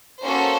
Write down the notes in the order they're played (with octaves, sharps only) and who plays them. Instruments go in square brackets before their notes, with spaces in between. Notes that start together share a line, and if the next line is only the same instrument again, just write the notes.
[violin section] A#3 C#4 F#4 A4 C5